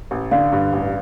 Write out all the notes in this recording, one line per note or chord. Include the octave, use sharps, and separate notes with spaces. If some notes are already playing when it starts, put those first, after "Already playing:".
A1
D3 D5 F5
G2
A1